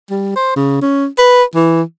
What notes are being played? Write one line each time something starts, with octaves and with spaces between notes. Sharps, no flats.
G3
C5
C#3
C#4
B4
E3